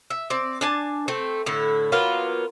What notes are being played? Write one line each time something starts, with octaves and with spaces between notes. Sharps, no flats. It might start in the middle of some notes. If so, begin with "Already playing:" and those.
E5
C4 D5
D4 G#5 A5
A3 C4
A2 D3 E4
F#3 A#3 B3 F4